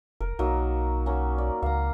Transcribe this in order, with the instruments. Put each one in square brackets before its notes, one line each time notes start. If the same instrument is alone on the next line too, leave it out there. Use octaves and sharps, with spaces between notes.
[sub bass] F1 [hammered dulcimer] A#4
[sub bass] B1 [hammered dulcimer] F#3 A#3 D#4
[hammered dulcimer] F#3 A#3 C#4
D5
[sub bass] C#2 [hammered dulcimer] F5 A#5